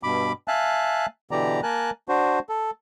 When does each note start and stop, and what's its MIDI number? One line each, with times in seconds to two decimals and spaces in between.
0.03 0.32 43
0.03 0.32 47
0.03 0.32 83
0.03 0.32 86
0.48 1.06 76
0.48 1.06 77
0.48 1.06 80
0.48 1.06 81
0.48 1.06 90
1.31 1.61 47
1.31 1.61 50
1.31 1.61 52
1.31 1.61 67
1.31 1.61 74
1.31 1.61 82
1.63 1.90 58
1.63 1.90 70
1.63 1.90 80
1.63 1.90 81
1.63 1.90 90
2.09 2.39 62
2.09 2.39 66
2.09 2.39 72
2.49 2.71 69